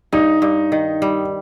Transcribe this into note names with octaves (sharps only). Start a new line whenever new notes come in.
G2 D#4
G2
D#3
G3